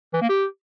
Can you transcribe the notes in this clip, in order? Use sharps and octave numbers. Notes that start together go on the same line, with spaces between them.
E3
A#3
G4